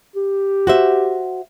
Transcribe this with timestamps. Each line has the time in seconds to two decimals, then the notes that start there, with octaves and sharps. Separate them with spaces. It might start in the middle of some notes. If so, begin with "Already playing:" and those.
0.16 G4
0.67 F#4 C5 E5